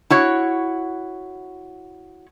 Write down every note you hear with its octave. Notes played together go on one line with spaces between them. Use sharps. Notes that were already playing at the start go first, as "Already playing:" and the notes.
E4 F#4 C#5